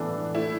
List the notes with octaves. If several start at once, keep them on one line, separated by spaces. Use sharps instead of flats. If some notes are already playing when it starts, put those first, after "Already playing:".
Already playing: A2 E3 B3 D4 A4
A3 E4